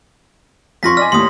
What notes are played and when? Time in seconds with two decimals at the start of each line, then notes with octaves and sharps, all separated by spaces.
0.83 F2 F4 C6 C#6 A#6 B6
0.97 D5 D#5 G#5 F6
1.12 D#2 A2 C6 D#6